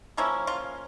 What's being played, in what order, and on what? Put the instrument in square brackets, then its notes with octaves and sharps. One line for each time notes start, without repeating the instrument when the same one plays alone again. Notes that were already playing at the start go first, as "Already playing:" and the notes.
[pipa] C#3 F3 A#3 C#4 E4
F4